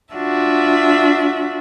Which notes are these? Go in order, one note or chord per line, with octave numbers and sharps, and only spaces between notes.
D4 F4 F#4 E5